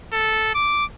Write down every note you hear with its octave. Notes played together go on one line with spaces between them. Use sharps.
A4
D6